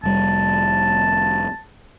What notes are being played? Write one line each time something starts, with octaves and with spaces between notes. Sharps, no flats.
F1 G3 A5